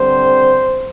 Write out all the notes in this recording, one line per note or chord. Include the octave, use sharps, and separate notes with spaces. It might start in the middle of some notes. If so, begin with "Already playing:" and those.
Already playing: D3 G3 C4 C5